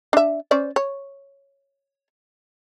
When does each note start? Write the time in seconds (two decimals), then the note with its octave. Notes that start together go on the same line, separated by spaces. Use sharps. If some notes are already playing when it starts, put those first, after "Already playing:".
0.13 D4 E5
0.51 C#4 C5 D5
0.76 C#5